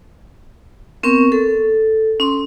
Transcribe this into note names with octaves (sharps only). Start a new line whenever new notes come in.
B3 C4 A#4 C#6
A4
C#4 C6